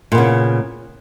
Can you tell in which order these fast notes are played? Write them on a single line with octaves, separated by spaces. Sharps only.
A#2 B3 C#3